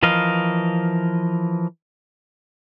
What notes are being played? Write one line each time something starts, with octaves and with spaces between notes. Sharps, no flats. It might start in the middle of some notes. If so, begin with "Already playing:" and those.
E3 F3 A#4 D#5 F5